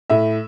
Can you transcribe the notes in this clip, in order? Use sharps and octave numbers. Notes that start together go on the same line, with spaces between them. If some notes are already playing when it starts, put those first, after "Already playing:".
A2 E5